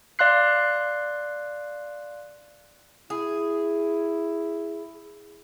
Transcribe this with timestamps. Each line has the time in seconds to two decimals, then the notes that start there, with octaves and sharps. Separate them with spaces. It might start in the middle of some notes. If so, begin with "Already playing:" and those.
0.19 D5 F5 C6 F#6 C7
3.10 E4 G#4